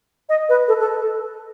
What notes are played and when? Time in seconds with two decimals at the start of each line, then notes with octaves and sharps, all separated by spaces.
0.29 D#5
0.49 B4
0.68 A4
0.80 A4